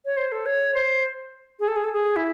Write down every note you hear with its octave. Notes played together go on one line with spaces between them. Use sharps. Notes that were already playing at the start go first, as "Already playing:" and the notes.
C#5
C5
A4
C#5
C5
G#4
A4
G#4
A4
G#4
E4